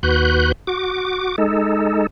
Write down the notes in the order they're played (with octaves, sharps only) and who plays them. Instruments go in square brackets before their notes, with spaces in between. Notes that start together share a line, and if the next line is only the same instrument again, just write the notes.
[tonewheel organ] D#2 F#4 B4 F#6 G6
F#4 D6
G#3 D#4 A4